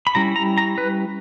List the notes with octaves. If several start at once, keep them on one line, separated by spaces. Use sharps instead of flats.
B5
G3 C#4 E4 A#5
A#5
A#5
B4